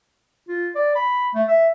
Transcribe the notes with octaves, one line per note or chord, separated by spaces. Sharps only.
F4
D5
B5
A3
E5